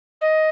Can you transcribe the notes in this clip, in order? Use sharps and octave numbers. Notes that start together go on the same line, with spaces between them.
D#5